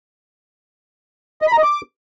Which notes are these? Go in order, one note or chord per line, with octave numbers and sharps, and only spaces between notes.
D#5
B5
A#5
D#5
D6